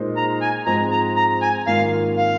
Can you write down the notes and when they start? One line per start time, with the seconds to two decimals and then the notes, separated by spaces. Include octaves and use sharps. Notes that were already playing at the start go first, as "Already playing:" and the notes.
Already playing: A#2 G#3 D#4 C5
0.17 A#5
0.42 G#5
0.66 G#2 F3 G#3 C4 A#5
0.92 A#5
1.17 A#5
1.42 G#5
1.67 G#1 G#2 D#3 A#3 F4 F5
2.17 F5